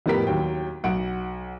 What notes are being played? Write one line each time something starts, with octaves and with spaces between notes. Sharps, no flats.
F2 A2 B3 G4 A#4 B6
D#2 F#3 G5
B1 F#5 D7